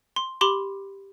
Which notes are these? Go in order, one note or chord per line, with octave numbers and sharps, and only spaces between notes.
C6
G4 B5 C6 D6